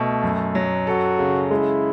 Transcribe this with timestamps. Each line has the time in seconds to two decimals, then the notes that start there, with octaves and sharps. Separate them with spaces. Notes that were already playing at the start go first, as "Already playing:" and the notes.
Already playing: B2 A3
0.23 F#2
0.55 F#3
0.87 F#4 A4
1.19 C#3
1.51 G#3 E4